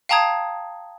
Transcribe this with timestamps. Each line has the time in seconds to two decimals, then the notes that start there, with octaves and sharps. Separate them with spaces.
0.09 F5 G5 A5 A#5 D#6 G#6